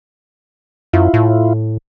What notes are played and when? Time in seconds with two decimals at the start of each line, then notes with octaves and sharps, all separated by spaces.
0.93 F#2 E4 F4
1.14 A2